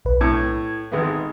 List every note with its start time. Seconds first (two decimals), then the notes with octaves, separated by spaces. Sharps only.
0.05 B1 B4
0.21 A2 G#6
0.92 G#1 G#3 B3